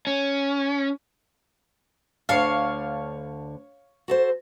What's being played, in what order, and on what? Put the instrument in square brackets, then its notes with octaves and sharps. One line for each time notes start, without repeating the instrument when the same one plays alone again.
[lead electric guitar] C#4
[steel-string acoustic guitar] D2 D3 A5 [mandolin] C#5 F5
[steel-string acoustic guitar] F#4 A4 C5